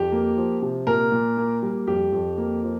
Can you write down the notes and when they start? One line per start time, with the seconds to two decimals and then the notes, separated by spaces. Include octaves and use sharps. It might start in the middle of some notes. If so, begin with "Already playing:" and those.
Already playing: F2 G4
0.12 A#3
0.37 F3
0.62 C3
0.87 A#2 A#4
1.12 A#2
1.37 A#3
1.62 G3
1.87 F2 G4
2.12 F2
2.38 A#3
2.63 F3